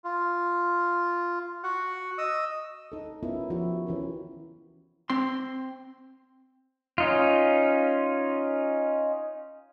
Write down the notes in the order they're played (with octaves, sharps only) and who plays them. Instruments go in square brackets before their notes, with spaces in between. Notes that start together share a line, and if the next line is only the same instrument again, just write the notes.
[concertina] F4
F#4 F#5
D#5 D#6 E6
[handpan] D#4 A4
B3 C#4 E4 F4 A#4
F3 E4 F#4 G4
E3 C#4 A#4
[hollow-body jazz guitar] C4 C6
[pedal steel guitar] C#4 D#4 F4